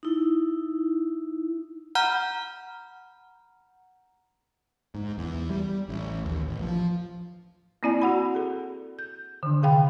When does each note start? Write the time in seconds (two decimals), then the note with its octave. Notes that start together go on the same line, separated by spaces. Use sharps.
0.03 D#4 E4
1.95 F#5 A#5 B5 F6 G6
4.95 G#2
5.18 E2
5.50 G3
5.89 A1
6.25 D#2
6.47 A1
6.62 F3
7.83 A#3 C4 E4 D5 G#5
8.02 F#4 F#5 B5
8.35 G#4 A4
8.99 G6
9.43 D3 D#3 D4
9.62 C3 D#3 G#4 F5 G5 B5